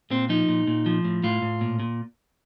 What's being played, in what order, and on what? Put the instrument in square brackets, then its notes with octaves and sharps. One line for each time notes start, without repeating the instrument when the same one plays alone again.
[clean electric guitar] A#2 C4
F3 D#4
A#2
A#2
F3
A2
A2 F4
A2
A#2
A#2